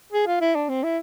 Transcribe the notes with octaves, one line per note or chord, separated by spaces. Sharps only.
G#4
F4
E4
D4
C4
E4